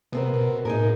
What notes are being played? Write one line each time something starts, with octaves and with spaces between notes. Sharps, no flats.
C3 B3 C4 A#4
B2
A2 D#4 G#4 A#4